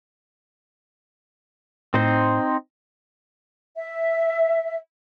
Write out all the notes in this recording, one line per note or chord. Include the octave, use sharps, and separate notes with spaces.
A2 C4 D#4 C5
E5